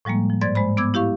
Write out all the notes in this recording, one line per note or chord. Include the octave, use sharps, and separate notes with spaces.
A2 F3 G3 G#3 A#3
F3
G#2 C5 D5 G#6 A6
G#3 C5 B5
B3 D6 E6 G#6
E4 G4 F5 C#6